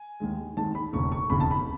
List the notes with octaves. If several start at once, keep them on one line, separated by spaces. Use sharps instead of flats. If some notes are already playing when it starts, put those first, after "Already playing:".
Already playing: G#5
D#2 D#3 G#3
D#2 D#3 G#3 A5
B5
E1 D#2 C#3 C#6
C#6
E1 D#2 C#3 B5
A5
B5